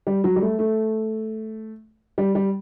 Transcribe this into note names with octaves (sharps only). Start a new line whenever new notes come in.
G3
F#3
G3
A3
A3
G3
G3